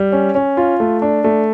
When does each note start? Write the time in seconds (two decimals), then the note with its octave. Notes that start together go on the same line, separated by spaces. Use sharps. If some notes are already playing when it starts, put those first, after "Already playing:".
Already playing: G3
0.12 C#4
0.35 C#4
0.57 F4
0.80 A3
1.02 D4
1.24 A3